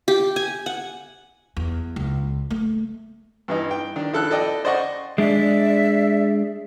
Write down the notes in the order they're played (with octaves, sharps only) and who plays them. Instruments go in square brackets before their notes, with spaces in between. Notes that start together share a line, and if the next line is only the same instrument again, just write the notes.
[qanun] G4
G#5
F#5
[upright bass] E2
C#2
A3
[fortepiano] G2 E3 D#4
G5
D#3 D4
A#1 E4 A4 G5 F#6
A4 D5 D#5 G5
C5 D5 D#5 F#5 C#6
[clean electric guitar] G#3 D4 [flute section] D5 E5